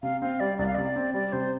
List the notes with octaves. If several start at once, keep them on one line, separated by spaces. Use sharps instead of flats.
C3 F5
C4 F5
G3 D5
C2 D5
F5
C3 D5
C4
G3 D5
C3 C5